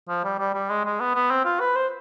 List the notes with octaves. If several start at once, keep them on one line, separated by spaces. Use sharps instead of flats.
F3
G3
G3
G3
G#3
G#3
B3
B3
C4
F4
B4
C5